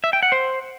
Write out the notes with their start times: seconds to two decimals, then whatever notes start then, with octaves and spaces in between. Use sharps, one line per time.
0.04 E5
0.13 G5
0.23 F#5
0.32 C5